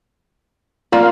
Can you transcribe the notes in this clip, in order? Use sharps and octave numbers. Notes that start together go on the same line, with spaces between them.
A#3 F4 D5